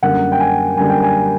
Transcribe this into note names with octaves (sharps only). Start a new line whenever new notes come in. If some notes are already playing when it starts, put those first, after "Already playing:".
F#2 D3 G3 A#3 F#5
G5
G#5
F#2 D3 G3 A#3 G#5
G5
G#5